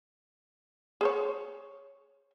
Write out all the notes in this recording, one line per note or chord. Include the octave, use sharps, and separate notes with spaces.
G#4 C5 C#5